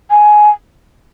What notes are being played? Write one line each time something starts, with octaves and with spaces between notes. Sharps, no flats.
G#5